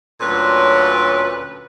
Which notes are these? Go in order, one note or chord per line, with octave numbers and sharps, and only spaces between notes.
D2 A#2 F#3 C#4 A4 B4